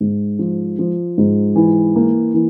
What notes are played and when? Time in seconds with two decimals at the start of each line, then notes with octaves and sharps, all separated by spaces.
0.01 G#2
0.39 F3
0.79 F3
1.18 G#2
1.56 E3
1.96 A#3
2.34 E3